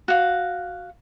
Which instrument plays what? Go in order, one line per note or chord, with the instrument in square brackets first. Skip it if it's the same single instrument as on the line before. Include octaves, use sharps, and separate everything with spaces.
[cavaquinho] F#4 F5